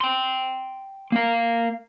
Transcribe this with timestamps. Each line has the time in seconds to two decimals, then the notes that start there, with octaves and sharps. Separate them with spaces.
0.01 G5 C6
1.12 A#3 F5